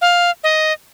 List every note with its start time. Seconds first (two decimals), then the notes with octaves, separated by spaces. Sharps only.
0.01 F5
0.44 D#5